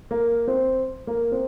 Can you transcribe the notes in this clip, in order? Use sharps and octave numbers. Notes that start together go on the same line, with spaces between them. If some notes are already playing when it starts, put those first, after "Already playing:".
A#3
C4
A#3
C4